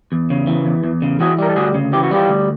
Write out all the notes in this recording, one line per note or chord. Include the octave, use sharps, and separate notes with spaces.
E2
C#3
E3
E2
E2
C#3
E3 F#4 G#4
G3 A#4
A4
D2 F#4 G#4
C#3
E3 G4
F#4
G3 F4 G4
D2